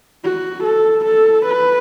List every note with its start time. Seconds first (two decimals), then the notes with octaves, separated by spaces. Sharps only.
0.24 F#4
0.63 A4
1.05 A4
1.46 B4